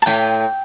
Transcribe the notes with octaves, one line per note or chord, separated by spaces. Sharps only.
A5
A2 G5